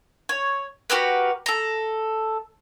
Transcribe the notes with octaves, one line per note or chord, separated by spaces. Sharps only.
C#5
F#4 G4 A#4 B4
A4 A#5